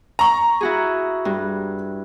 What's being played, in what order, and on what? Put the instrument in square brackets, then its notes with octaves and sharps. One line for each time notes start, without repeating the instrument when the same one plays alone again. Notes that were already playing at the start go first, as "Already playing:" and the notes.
[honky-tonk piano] A#5 C#6
[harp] E4 F#4 G#4
G2